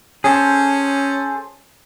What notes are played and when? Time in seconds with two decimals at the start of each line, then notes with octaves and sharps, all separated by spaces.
0.24 C#4 G#4 A4 C5